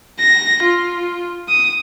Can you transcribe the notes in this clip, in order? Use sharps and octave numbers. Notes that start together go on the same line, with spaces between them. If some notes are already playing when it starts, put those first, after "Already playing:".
A#6
F4
D#6